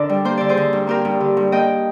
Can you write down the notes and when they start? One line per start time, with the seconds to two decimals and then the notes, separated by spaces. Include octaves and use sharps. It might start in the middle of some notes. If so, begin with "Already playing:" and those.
Already playing: D3 D4 A#4 D5
0.09 G3
0.25 A#3 C5
0.37 D3 D5
0.49 G#4 C5
0.57 D3
0.73 G2
0.87 A#3 G4 A#4
1.05 G2
1.20 D3
1.37 G2
1.52 A#3 D#5 G5